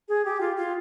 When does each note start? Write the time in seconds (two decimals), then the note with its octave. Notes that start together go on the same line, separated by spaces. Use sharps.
0.09 G#4
0.25 G4
0.40 F4
0.56 F4